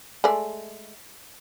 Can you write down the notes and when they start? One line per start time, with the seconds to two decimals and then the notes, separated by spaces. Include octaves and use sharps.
0.24 G#3 A3 D5